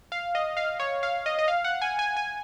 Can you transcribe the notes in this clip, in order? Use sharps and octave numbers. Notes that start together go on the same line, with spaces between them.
F5
D#5
F5
C#5
F5
D#5
D#5
F5
F#5
G#5
G#5
G#5